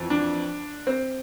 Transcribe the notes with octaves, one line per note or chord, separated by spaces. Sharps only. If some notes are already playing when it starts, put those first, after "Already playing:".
Already playing: F2 E3
D4
C4